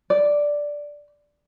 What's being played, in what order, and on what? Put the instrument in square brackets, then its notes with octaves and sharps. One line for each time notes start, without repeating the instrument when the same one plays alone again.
[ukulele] D5